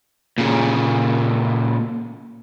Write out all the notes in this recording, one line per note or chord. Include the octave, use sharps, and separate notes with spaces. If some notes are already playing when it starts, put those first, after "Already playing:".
A#2 C#3